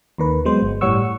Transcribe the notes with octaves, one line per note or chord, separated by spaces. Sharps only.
D#2 D#3 B4
F#3 G#3 B3 C5
G1
A2 G3 C#5 F#5 C#6 E6